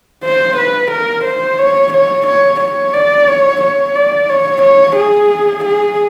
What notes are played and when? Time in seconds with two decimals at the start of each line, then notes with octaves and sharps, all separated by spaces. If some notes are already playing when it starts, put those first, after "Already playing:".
0.25 C5
0.57 B4
0.91 A#4
1.25 C5
1.59 C#5
1.93 C#5
2.27 C#5
2.61 C#5
2.94 D5
3.28 C#5
3.62 C#5
3.96 D5
4.29 C#5
4.63 C#5
4.97 G#4
5.65 G#4